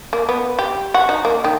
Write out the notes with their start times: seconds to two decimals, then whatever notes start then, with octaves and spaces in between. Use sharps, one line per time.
0.13 A#3
0.29 B3
0.59 G4
0.94 F#4
1.09 D#4
1.25 A#3
1.44 D#3